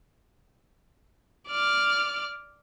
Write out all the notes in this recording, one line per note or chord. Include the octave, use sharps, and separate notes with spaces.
D5 F6